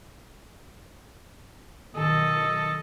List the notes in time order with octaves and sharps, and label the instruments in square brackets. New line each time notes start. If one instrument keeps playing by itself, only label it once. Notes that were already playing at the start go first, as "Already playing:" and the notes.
[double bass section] B1 D#3 [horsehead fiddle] A4 D#5